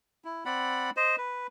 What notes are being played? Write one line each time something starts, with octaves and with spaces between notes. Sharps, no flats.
E4
C4 D5 F#5 B5
C5 D#5
B4